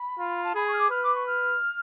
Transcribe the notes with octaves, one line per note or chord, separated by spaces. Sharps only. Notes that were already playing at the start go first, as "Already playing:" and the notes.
Already playing: B5
F4
A5
G#4 B5
C#6
F6
D6
B4 F6
D6
C#6
F6